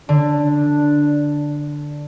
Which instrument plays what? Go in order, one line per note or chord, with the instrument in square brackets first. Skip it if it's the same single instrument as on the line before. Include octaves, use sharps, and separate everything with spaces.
[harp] D3 [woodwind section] D4